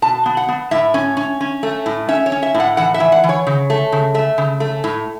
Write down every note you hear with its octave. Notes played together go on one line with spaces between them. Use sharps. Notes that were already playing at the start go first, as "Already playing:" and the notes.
B2 A5
B3
F#5
B3
A2 E5
C#4
C#4
C#4
A3
A2
C#4 E5
C#5
C#4
E5
A2
F#5
E3 F#5
E5
E3
F#5
E3
C#5
C#3
A3
C#3
A3 E5
C#3
A3
A2